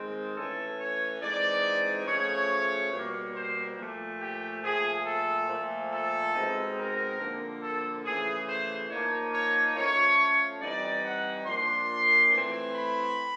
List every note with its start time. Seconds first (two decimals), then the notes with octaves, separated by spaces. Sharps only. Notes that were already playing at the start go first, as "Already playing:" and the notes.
Already playing: D#3 G#3 C4
0.36 E3 A3 C#4 A4
0.79 C#5
1.21 E3 G#3 C4 D#4 D5
2.07 C#3 F3 A3 C#5
2.92 B2 G3 A#3
3.35 C5
3.78 A#2 F3 A3
4.21 G4
4.63 A#2 F3 A3 G#4
5.05 A4
5.48 A#2 F3 A3
5.91 A4
6.34 B2 G#3 C4 D#4
6.77 A#4
7.20 D3 F3 A#3
7.62 A4
8.05 C#3 E3 A3 G#4
8.48 C5
8.90 F3 A#3 D#4 C#5
9.33 C#5
9.76 F3 A3 C#4 C#5
10.61 E3 G3 C4 D#4 D5
11.04 F#5
11.46 A#2 F3 A#3 D4 C6
12.32 E3 A3 C4
12.75 B5